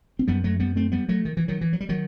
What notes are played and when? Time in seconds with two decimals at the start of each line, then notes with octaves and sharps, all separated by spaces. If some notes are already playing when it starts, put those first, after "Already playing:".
0.19 C4
0.28 F#2 G3 B3
0.44 F#3 A3
0.60 G3 B3
0.76 A3 C4
0.92 G3 B3
1.09 F#3 A3
1.25 D#3
1.37 E3
1.48 D#3 F#3
1.61 E3
1.73 F#3
1.80 G3
1.89 D#3 F#3